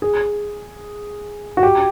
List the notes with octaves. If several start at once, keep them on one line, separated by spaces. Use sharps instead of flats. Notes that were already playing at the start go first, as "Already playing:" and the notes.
G#4
F#4
G4